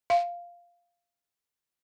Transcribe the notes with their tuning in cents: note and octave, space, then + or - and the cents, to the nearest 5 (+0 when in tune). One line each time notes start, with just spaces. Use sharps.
F5 -5